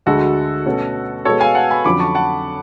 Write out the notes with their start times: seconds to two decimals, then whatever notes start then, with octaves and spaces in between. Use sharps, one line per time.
0.06 D2 D3 G#3 F#4 A4
0.66 B2 A3 C#4
1.25 B2 G#3 B3 A4 C#5
1.40 F5 G#5
1.55 F#5 A5
1.71 G#5 B5
1.84 F2 D3 F#3 C#4 B5 D6
1.99 A5 C#6
2.15 F#5 A5